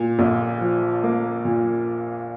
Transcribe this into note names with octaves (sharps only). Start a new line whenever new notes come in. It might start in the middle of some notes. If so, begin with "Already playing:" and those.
Already playing: A#2
A#1
F3
A#3
A#2